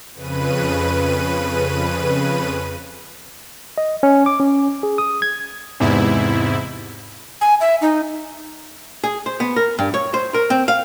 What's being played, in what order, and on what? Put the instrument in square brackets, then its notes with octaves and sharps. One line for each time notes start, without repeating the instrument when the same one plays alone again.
[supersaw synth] F2 C#3 B4 D#7
[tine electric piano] D#5
C#4
D6
C#4
G#4
D#6
G#6
[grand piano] E2 C3 [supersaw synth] G#2 E4
[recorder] G#5
E5
D#4
[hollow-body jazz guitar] G#4
C5
B3
A#4
G2
C#5
C5
A#4
C4
F5